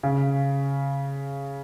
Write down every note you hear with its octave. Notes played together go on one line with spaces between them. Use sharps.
C#3